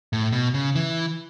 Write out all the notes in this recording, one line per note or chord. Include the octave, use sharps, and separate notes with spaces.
A2
B2
C#3
E3